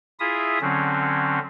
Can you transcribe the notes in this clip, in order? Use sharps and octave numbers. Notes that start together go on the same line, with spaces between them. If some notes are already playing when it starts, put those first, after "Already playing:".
E4 F4 G#4 E5 D#6
D3 F#3 C4 C#4